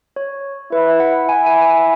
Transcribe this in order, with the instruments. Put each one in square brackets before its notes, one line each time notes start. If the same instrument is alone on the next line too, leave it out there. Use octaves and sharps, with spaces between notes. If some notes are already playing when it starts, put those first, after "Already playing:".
[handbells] C#5
[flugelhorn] E4 [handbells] B4
[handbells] F#5
[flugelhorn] E4 [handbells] G#5
[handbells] G#5
G#5